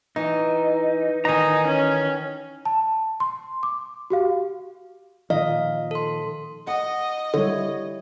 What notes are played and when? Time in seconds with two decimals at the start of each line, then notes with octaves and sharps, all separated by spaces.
0.16 E3 D#4
1.25 D#3 E3 D#4 G#5 A#5
1.67 C#4
2.65 A5
3.20 C6
3.63 D6
4.10 F#4 G4 F5
5.30 A#2 D#3 F3 D#5 F5
5.91 A4 C6
6.67 D#5 F#5
7.34 D3 G3 E4 C#5